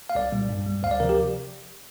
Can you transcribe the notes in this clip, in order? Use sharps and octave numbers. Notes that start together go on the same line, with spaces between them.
F5
C2 D5
A#2 G3
G2
G3
D2 F5
D5
C3 F3 A#4
G4